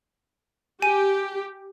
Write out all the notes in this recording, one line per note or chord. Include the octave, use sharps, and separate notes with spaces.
G4 G#5 D#7